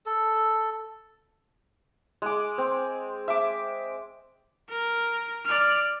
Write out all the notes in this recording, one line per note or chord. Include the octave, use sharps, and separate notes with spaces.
A4
G#3 D6
C4
E5 D6
A#4
D5 F6